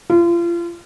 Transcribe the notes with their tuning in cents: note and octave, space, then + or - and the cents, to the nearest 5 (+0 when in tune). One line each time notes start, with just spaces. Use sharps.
F4 -35